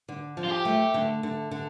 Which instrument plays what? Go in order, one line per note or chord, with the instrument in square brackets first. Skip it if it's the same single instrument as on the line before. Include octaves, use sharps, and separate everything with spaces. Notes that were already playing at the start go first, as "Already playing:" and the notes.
[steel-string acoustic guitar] D3
F3
[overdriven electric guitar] F4
G4
[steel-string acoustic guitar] A3
D3
D3
D3